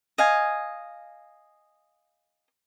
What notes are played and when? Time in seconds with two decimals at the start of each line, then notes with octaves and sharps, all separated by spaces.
0.18 D#5 F5 G#5